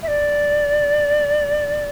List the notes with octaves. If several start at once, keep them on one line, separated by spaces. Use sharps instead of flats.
E5
D5